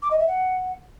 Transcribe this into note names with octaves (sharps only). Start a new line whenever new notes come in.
D6
D#5
E5
F#5